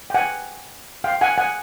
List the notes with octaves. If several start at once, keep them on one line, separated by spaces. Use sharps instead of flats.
G5
F#5 G#5
F5 G5
F#5 G#5
F#5 G#5